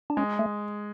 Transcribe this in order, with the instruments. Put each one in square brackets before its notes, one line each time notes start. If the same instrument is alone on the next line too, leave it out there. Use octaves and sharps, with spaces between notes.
[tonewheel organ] D4
[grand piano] G#3 [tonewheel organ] C#4
[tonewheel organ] A3